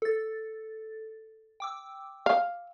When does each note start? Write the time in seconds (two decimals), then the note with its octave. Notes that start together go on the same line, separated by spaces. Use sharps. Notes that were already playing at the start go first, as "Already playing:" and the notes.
0.02 A4 A6
1.60 G5 D6 E6
2.26 F5